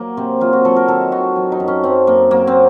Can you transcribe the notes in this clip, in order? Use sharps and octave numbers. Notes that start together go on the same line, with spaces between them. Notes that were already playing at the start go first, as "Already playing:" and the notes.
Already playing: F#3 A#3
C3 C4
F#3 F4
F#4
F#3 A4
A#4
D#3 A4
D#3 F#4
F#3
D#4
F#2
C#4
F#2 C4
F#2 A#3
F#3 A#3
C4